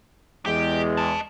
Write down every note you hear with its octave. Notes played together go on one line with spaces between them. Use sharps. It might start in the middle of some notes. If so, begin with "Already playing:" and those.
E2 G#3 G4
D#5 A5